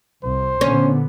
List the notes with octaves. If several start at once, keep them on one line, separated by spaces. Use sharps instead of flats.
C2 C5
A#2 D3 B3 C#4